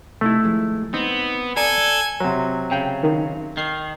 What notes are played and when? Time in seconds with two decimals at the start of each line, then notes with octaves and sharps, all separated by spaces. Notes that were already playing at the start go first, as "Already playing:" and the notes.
0.21 C3 A3 D#4 E4 A4
0.43 D#2 F3 G#3
0.94 B3 C4 D#4
1.57 A4 D5 G5 G#5 A#5
2.20 C3 F#3
2.71 C#3 G5
3.03 D#3
3.57 D#3 C7